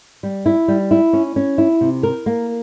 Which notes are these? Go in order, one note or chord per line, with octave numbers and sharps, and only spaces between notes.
G3
E4
G3
E4
C#4
C#4
E4
C3
A#4
A#3